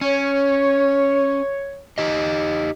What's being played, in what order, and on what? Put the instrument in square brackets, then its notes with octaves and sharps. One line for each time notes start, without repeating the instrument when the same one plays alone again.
[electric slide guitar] C#4 [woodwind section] C#5
[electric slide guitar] D#4 G4 D#5